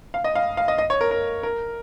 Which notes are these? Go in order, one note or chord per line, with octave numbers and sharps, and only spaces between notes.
F5
D#5
F5
F5
D#5
D#5
C#5
A#4
A#4
A#4